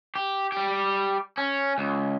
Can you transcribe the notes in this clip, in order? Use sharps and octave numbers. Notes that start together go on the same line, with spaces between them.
G4
G3 G4
C#4
C#2